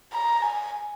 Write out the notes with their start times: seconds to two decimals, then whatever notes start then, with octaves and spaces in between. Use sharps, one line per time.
0.13 A#5
0.43 G#5